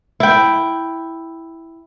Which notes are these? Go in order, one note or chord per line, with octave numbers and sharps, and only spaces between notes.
E4 G5